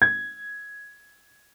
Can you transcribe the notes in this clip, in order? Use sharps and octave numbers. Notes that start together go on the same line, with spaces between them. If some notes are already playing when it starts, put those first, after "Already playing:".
G#6